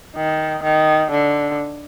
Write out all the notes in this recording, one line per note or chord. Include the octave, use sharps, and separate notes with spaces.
D#3
D#3
D3